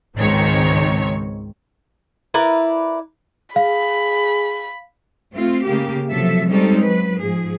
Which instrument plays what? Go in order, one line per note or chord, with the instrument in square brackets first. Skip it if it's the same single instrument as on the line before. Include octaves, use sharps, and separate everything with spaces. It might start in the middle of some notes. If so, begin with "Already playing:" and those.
[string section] G#1 C#2 D#3 C4 C#5
[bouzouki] E4 A#4 B4 D5
[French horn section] G#4 [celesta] F5 [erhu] B5
[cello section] A3 C4 F4
C#3 A#3 G4
C3 F3 F#3 A4 E5
G3 G#3 C4 C#4 D#4 A4
F#3 B4
G#2 F3 G#4